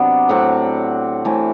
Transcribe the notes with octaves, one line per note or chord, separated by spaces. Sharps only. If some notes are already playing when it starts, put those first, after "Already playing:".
Already playing: C3 F#3 B3 D4 G5
A2 F#3 C4 F#5
A2 E3 A3 C4